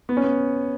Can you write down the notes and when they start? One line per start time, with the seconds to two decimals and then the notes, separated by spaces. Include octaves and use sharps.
0.09 B3
0.17 C#4
0.24 B3